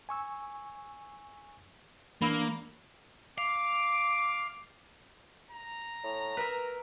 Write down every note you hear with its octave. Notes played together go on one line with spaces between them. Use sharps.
G#5 C#6 E6
E3 A#3 D4 B5 E6
F5 D6
A#5
A2
A#4 B4 E5